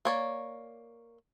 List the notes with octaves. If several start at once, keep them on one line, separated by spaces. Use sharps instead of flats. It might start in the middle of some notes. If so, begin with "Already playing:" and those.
A#3 C#5 D5